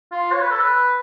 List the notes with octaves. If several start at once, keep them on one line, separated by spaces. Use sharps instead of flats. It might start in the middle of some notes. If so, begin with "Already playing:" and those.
F4
C#5
B4
A4
B4